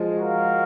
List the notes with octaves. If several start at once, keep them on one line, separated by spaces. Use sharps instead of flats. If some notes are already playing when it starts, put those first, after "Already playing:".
Already playing: F3 G#3
F#4 A#4 F5